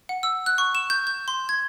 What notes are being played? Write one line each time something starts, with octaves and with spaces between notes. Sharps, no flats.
F#5
E6
F#6
C#6
E7
G6
G6
C6
G#6